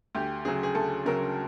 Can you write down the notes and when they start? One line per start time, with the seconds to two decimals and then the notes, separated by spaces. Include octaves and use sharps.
0.15 D2 G4
0.45 C#3 F#3 G#4
0.63 G#4
0.75 D2 A4
1.05 C#3 F#3 A#4